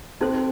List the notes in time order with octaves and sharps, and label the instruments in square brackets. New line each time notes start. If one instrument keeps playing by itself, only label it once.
[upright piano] C4 [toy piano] D#4 F#4 A4 C5